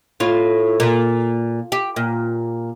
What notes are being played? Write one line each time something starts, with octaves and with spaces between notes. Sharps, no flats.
A2 F4
A#2
G4
A#2